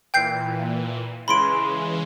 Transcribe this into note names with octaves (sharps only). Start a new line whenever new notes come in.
A#2 E3 G5 G6 C7
C#3 E3 G#3 B5 C6 D7